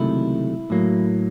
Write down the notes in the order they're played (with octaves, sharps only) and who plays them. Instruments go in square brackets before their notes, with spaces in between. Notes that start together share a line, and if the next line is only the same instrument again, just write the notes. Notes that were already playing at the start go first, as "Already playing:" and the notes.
Already playing: [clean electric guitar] C#2 C3 D#3 F#3 A3 E4
A2 F#3 A#3